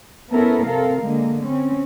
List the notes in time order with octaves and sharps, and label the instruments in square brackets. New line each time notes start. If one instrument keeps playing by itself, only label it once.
[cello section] B3 C#4 E4 A4 A#4
C3 C4 A4 A#4 F5
D3 G#3 A#3
C4 C#4